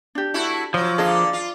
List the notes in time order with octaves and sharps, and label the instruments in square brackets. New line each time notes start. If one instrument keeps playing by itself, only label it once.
[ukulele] D4 G4
[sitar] A3 E4 F#4
[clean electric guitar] F3 [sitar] F#3
[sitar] D3 A#3 D4 [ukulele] G#4 D#5 F5
[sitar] F4